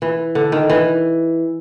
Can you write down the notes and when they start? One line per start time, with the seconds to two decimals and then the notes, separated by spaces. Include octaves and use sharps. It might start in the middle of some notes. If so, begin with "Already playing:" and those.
0.02 E3
0.35 D3
0.52 D#3
0.70 E3